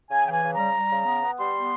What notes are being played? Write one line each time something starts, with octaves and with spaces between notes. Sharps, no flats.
C#3 G#5
E3 G5
G#5
C#3
A#5
G3
G3
C#3
B3
B3
G3 C6
B3